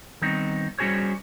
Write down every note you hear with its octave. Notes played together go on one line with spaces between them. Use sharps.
D#3 G3 B3 C4 D#4
G3 C#4 F#4 G#4 C5 C#5